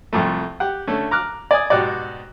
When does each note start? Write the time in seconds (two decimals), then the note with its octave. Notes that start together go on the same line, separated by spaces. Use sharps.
0.13 C2 F2 A3
0.60 G4 F#5
0.87 D3 A3 C#4
1.11 A#5 D6 F6 F#6
1.51 D5 G#5 D#6
1.70 G#2 B2 F#4 G4 D5